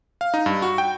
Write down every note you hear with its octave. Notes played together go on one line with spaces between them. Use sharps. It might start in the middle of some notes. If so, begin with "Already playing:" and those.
F5
D#4
G2
F#4
G5